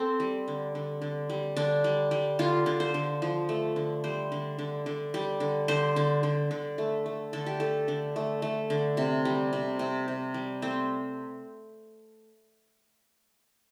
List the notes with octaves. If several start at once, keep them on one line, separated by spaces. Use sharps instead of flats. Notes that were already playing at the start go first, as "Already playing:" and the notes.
Already playing: C4 A4
G3
D3
D3
D3
G3
D3 D4
G3
G3
D3 F4
D3
C5
D3
F3
A3
D3
G3 C5
D3
D3
D3
G3
D3
D3 C5
D3
D3
D3
A3
A3
D3 A4
G4
A3 A4
D3
A3
A3
D3
C3
G3
C3
C3
C3
G3
A3 C4